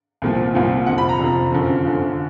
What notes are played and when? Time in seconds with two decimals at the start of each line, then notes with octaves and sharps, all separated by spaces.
0.22 C2 A#2 F3
0.55 C2 A#2 F3
0.86 F2 C3 F3 F#5
0.98 B5
1.09 A#5
1.20 F2 C3 F3
1.52 F#2 D3 F3
1.85 F#2 D3 F3